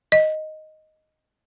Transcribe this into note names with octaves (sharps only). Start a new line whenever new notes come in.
D#5